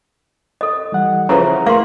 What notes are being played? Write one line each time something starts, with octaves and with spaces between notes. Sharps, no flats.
A4 D#5
E3 G3 F#5
C#3 E3 F3 A#5
A3 A#3 E4 A#4 F5 C6